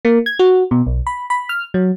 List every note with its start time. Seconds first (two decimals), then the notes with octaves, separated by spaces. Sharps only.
0.05 A#3
0.26 G#6
0.39 F#4
0.71 B2
0.87 B1
1.07 B5
1.30 B5
1.49 F6
1.74 F#3